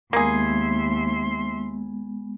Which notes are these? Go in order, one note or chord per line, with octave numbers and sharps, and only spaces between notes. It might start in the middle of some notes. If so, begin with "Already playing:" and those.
D#2 G#3 A#3 B3 G#4 E5 C6